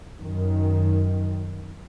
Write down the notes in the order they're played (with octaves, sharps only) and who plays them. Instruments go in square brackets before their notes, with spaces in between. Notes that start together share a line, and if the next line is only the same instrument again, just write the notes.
[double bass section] F#2 D#3